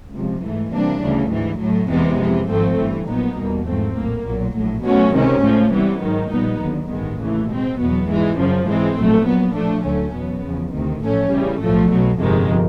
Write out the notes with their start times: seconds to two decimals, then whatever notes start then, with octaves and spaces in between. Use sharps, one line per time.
0.13 C#2 C3 F3
0.42 G#2 E3 A3
0.72 C3 E3 G3 A#3 D4
1.01 D2 C#3 E3 G3
1.31 G#2 E3 G3
1.60 A2 F#3 A3
1.89 E2 C3 E3 G#3 B3
2.19 F2 C3 E3
2.48 G#1 G#2 F3 A3 C4
2.77 G1 G2 E3
3.07 A#1 A#2 F#3 B3 D#4
3.37 E2 B2 G3 A#3
3.66 G#2 F3 A3 C4
3.96 A#1 A2 F#3 A#3
4.25 B1 A#2 F#3
4.55 A#1 A2 F#3
4.84 B2 F#3 A3 C#4 F#4
5.14 C#2 C3 D#3 G#3 C#4
5.43 A2 F3 A3
5.72 C3 E3 G3 B3
6.02 G#2 D#3 F#3
6.31 A#1 A#2 G3 B3 D#4
6.60 D#2 D3 F#3
6.90 A1 G2 D#3 G#3 B3
7.19 D#2 C#3 E3 A3
7.48 B2 G#3 C4
7.78 E2 B2 F#3 B3
8.07 G#2 E3 G#3
8.37 F#2 C#3 F3
8.66 G#2 E3 G#3 C4
8.97 A#1 A2 F#3 A3
9.26 A#2 F#3 B3
9.54 A2 F3 A3 D4
9.84 D2 D3 F#3 A3 C#4
10.14 E2 B2 F#3 B3
10.43 E2 C#3 F3
10.73 D2 C3 D#3
11.02 A1 A2 F3 A3 C#4
11.32 C#3 E3 G3
11.61 B1 A2 F3 A3
11.90 B1 B2 F#3
12.20 G1 F2 C3 D#3 G#3